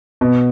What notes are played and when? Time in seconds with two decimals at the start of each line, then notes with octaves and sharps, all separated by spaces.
0.21 B2